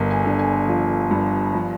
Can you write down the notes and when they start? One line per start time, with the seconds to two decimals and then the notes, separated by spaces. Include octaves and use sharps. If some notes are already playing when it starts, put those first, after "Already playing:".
Already playing: G1 A#4
0.11 G#5
0.25 D3
0.39 G#5
0.67 F3
1.11 G2
1.53 F3